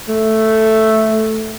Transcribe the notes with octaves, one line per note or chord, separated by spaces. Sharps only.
A3